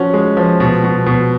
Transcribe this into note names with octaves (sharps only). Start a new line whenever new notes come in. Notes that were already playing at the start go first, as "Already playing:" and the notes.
Already playing: F3 C#4 F#4
G#3
F3
B2
B2
B2